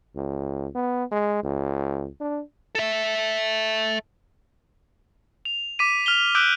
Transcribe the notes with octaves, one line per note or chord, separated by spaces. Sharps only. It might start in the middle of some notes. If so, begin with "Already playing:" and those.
C#2
B3
G#3
C#2
D4
A4 E5
F7
D6 B6 D#7
F6 F7 G7
D6 E6 F#6 G6 B6 D7